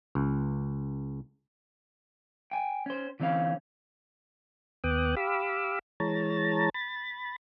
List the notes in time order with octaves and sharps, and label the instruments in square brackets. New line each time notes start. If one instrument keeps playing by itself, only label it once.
[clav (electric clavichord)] C#2
[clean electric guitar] G5 G#5
C#4 C5
D3 E3 C4 C#4 F5
[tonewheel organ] D#2 B3 G5 D6 D#6 F#6
G4 F5 B5 D6 E6
E3 G#3 C#5 A5 A#5 A6
B5 A6